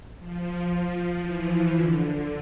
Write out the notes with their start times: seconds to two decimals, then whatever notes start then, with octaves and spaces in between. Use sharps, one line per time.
0.19 F3
0.70 F3
1.21 E3
1.72 D3